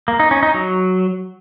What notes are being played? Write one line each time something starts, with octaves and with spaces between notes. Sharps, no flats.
A#3
D#4
C#4
D#4
F#3